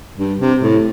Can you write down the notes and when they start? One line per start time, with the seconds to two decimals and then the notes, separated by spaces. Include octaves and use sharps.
0.18 G2
0.40 C3
0.62 A2